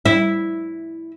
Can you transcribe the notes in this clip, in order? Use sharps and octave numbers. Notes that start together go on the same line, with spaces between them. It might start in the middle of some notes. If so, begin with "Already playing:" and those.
E4